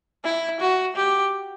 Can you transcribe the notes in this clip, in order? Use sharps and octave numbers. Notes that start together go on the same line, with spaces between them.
E4
F#4
G4